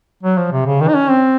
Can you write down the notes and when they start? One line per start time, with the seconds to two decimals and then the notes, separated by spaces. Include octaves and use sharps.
0.23 F#3
0.38 F3
0.52 C3
0.66 C#3
0.81 D#3
0.89 D#4
0.96 C#4
1.10 C4